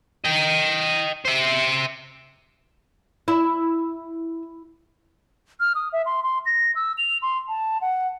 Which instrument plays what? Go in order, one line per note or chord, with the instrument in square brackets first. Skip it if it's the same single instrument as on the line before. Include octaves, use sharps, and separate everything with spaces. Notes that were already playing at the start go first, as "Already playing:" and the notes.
[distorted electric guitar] D#5 G5
C5 E5
[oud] E4
[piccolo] F6
D#6
E5
C6
C6
A#6
E6
F7
C6
A5
F#5